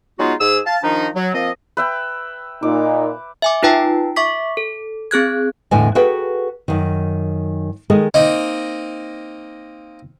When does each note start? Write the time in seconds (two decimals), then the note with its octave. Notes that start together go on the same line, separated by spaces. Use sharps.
0.19 F#3 G#3 B3 D#4 F4 F#4
0.40 G#2 G#4 E6
0.66 F5 A5
0.83 D#3 F3 D4 D#4
1.16 F#3
1.34 F3 A#3 C4 D#5
1.77 B4 E5 G5
2.63 A#2 D#4 D6
3.42 E5 G#5 D6
3.63 D#4 F4 B4 G5 A5
4.16 E5 C#6 D6 B6
4.57 A4
5.11 C4 G#4 F#6 G#6
5.71 E2 A2 D3 D#5 G#5 A5
5.95 F#4 G#4 A4 B4 F#5 G5
6.68 F#2 D#3
7.90 D#3 G#3 G#4 A4 D#5
8.14 A#3 C4 D#4 D#5